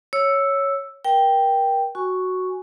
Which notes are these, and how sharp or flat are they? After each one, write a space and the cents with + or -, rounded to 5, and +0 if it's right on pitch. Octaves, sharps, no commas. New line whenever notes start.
C#5 +0 E6 +0
A#4 +30 G5 +0
F#4 +0 G#5 +0 C#6 +0